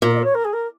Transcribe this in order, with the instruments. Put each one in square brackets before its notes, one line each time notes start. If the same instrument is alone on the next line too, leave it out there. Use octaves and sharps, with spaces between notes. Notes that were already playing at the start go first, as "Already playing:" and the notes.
[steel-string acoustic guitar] A#2 [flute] A#4
[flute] D#5
A#4
C#5
A#4
G#4
A#4